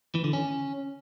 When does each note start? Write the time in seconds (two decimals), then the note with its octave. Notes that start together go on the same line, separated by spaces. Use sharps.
0.15 E3
0.24 D3
0.33 C#4